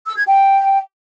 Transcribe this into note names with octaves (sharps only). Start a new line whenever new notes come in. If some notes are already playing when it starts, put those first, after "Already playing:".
E6
G#6
G5